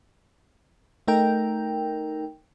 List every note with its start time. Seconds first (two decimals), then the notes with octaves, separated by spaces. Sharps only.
1.08 A3 D#4 A#4 G5